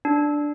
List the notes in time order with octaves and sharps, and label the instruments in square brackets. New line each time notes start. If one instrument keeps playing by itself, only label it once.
[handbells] D4